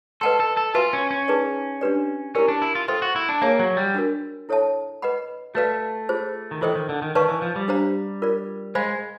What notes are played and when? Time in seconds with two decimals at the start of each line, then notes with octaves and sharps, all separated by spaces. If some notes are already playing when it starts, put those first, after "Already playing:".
0.21 A4 B4 D#5 F#5 A5 C6
0.40 A4
0.57 A4
0.74 F4 F#4 B4 E5 G#5 C6
0.93 C#4
1.11 C#4
1.28 D#4 G#4 B4 D5
1.81 D4 G4 B4 D5
2.35 C#4 E4 G4 A#4 D5
2.48 D4
2.62 E4
2.75 F4
2.88 F4 A4 C5 E5 G5 C6
3.02 F#4
3.16 E4
3.29 D4
3.42 A#3 G#4 C#5 E5 G#5
3.59 F#3
3.77 G3
3.95 D4 F#4 A#4
4.49 E4 A4 C#5 E5 A5
5.02 B4 D#5 F#5 B5
5.55 A3 F#4 B4 D5 F5
6.09 F4 G#4 C5
6.51 D#3
6.61 E3 F4 A4 C5 D#5 G5
6.75 D#3
6.89 D3
7.02 D#3
7.15 D#3 B4 D5 F5 A5 C#6
7.28 E3
7.42 F3
7.56 G3
7.68 D4 G4 C5 F5 A#5
8.22 F4 A#4 D5
8.75 G#3 C5 F5 G#5 B5